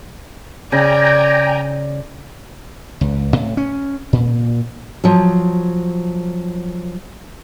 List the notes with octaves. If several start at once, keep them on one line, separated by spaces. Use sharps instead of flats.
C#3 D5 G5 G#5 A#5
C#2
A2
C#4
A#2
F3 F#3